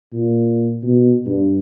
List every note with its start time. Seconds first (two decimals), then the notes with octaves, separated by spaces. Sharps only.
0.13 A#2
0.83 B2
1.27 G2